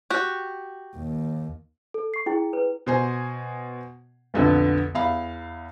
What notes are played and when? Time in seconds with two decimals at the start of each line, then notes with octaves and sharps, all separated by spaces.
0.10 F#4 G4
0.96 D#2
1.94 A4
2.14 C#6 C7
2.26 E4 G#4 G5
2.53 B4
2.86 B2 C5 G#5
4.34 B1 F2 D3 B3
4.94 E2 E5 F5 B5